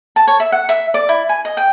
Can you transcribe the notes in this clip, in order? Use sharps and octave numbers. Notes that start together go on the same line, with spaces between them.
A5
C#5
E5
F#5
E5
D5
E4
G#5
D#5
G5